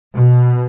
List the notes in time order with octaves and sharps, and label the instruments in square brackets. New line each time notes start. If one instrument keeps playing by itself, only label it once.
[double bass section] B2